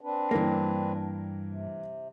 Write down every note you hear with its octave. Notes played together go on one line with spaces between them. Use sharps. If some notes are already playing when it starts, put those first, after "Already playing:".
C4 D4 B4
G2 E3 A#3 A#4
C3